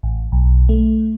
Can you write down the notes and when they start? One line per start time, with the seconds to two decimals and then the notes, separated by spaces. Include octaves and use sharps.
0.03 A1
0.32 B1
0.69 A3